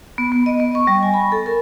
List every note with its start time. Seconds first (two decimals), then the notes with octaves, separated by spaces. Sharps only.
0.18 B3
0.32 B3
0.46 D#5
0.60 B3
0.75 C#6
0.87 G3
1.03 G#5
1.14 B5
1.32 A4
1.46 A#4